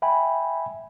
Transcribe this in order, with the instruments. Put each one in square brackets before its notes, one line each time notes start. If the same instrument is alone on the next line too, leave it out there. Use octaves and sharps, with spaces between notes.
[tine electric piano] E5 G5 G#5 B5